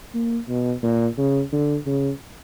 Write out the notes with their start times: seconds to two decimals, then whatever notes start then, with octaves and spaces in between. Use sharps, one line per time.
0.14 A#3
0.49 B2
0.83 A#2
1.18 C#3
1.52 D3
1.86 C#3